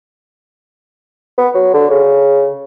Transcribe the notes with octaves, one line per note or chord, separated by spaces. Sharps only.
B3
F#3
D3
C#3